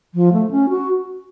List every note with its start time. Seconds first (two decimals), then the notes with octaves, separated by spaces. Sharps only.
0.14 F3
0.33 A3
0.51 C#4
0.69 F#4